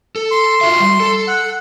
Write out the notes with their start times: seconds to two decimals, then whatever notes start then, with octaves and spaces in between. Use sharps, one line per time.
0.16 A4
0.31 C6
0.61 F4 F#4 E5
0.80 G3
1.00 A4
1.28 F#5